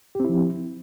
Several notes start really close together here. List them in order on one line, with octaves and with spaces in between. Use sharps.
G4 C4 E4 F3